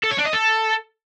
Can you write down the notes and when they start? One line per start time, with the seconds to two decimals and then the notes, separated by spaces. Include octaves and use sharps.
0.04 A4
0.11 C#5
0.18 D4
0.26 D#5
0.33 A4